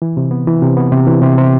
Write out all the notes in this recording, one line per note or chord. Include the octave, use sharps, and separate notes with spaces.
E3
C3
B3
E3
C3
B3
C3
E3
C3
C3